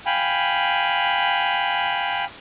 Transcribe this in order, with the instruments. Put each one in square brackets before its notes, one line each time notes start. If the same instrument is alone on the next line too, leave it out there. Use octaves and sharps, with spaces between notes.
[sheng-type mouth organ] F5 G5 G#5 B5